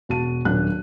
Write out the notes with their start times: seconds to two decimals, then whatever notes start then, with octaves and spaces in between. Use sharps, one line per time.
0.09 E1 F#4 A5 D#7
0.45 D#1 F#3 D4 F#6